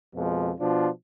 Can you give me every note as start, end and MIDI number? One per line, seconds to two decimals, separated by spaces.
0.15 0.51 41
0.15 0.51 47
0.15 0.51 53
0.15 0.51 56
0.60 0.89 47
0.60 0.89 53
0.60 0.89 62
0.60 0.89 65